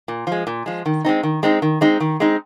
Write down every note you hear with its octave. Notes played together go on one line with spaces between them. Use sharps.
A#2
F3 G#3
A#2
F3 G#3
D#3
G#3 C4 D#4
D#3
G#3 C4 D#4
D#3
G#3 C4 D#4
D#3
G#3 C4 D#4